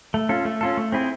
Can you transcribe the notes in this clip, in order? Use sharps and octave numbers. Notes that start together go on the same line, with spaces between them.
A3
C#4 F4 A4
A3
C#4 F4 A4
A3
C4 E4 G#4